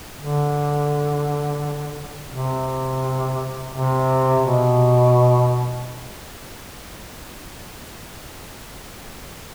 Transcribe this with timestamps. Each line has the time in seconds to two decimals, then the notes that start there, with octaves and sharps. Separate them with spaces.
0.17 D3
2.30 C3
3.73 C3
4.44 B2